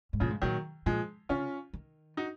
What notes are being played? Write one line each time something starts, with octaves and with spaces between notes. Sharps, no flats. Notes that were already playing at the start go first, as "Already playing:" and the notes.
G#2
A#2 C#3 F3
G#2
A#2 D#3 F#3
A#2 F3 G#3
C#3 C#4 F4
D#3
D#4 F#4